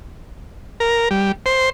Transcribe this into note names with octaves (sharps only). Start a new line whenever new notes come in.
A#4
G3
C5